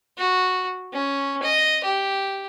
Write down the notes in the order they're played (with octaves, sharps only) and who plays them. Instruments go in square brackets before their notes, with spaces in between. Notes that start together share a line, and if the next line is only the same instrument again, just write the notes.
[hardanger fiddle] F#4
C#4
D#5
G4